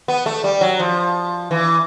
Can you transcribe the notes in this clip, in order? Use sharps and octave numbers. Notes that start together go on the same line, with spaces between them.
B3
A3
G3
F#3
F3
E3